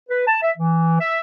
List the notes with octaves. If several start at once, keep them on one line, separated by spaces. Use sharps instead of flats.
B4
A5
E5
E3
E5